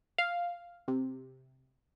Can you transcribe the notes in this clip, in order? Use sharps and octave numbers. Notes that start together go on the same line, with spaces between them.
F5
C3